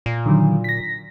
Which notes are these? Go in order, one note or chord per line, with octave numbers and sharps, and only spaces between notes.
A#2
D3 D#3 F#3
A#6 B6